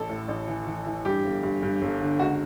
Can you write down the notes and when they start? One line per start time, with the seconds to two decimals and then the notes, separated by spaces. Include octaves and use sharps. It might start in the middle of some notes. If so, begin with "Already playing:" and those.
Already playing: A1 A4
0.09 A2
0.28 A1
0.48 E3
0.67 E3
0.86 E3
1.05 G2 G4
1.25 G1
1.43 G2
1.63 G2
1.82 G1
2.00 D3
2.19 C#2 F#4